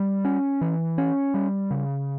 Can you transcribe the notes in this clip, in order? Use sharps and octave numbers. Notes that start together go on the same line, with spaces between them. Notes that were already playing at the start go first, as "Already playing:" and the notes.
Already playing: G3
C#4
E3
C#4
G3
C#3